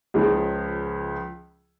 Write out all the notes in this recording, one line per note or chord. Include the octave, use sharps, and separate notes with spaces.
C#2 C#3 F3